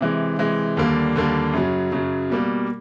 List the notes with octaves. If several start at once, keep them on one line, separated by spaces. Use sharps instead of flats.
C3 E3 G#3
C3 E3 G#3
D#2 D3 G3 A#3
D#2 D3 G3 A#3
F#2 C#3 F#3
F#2 C#3 F#3
B2 G3 A#3